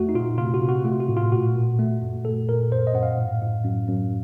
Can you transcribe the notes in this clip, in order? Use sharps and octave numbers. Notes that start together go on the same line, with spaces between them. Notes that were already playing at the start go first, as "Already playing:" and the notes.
Already playing: F2 A3 F#4
D#4
A#2 F4
C3 F4
F#4
C3
F#4
A3 F4
F#4
A2
F4
A#2 F#4
A#2
A3
F#2
A#2 A4
A#2 A#4
F#2 C5
D#5
F#2 F#5
F5
A2
A2
F#2
F#2